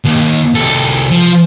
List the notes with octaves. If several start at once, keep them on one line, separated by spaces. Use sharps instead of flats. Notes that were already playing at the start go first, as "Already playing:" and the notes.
D#2
C2 A4
F3